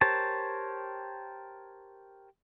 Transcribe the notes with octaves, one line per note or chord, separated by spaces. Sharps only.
G4 A#4 C5 C#5 A5